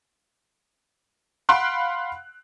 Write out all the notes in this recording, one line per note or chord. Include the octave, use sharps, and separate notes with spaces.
F5 F#5 B5 C6 F#6 D7